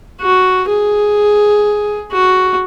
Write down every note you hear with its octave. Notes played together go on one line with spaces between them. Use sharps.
F#4
G#4
F#4